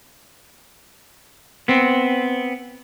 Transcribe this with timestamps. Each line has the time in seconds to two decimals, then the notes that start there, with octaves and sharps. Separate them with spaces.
1.68 B3 C4